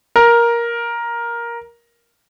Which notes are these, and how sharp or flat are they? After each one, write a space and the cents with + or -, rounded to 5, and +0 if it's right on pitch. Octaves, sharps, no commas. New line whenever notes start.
A#4 +10